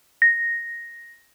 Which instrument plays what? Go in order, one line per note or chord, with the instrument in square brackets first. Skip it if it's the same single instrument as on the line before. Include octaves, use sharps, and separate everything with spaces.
[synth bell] A#6